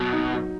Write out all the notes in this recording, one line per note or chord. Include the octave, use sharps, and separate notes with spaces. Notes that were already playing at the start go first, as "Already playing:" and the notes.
Already playing: B2 F#3
D#4
F#3